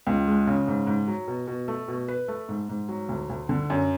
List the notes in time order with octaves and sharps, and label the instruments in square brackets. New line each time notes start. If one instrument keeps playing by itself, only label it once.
[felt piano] C#2
G#3
C#3
G#2
G#2
F#3
B2
B2
A3
B2
B4
A3
G#2
G#2
F#3
D2
D2
D3
F#2